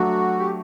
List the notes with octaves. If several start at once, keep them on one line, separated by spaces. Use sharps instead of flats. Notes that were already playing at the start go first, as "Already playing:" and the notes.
Already playing: F#3 A3 D4 F#4
G4